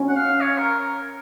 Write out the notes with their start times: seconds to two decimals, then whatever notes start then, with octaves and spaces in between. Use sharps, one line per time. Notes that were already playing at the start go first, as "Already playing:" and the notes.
Already playing: C#4
0.09 F#5
0.16 F5
0.41 C#5
0.58 A#4